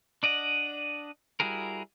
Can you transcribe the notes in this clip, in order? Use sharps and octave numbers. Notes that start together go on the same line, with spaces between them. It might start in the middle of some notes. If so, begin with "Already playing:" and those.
D4 D5 D#5 F#5
G3 E4 F#4 G#4 A#4